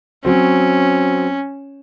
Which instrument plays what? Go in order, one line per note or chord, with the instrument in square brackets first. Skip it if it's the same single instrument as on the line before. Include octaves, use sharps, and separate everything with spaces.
[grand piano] F#3 C4 [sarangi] C#4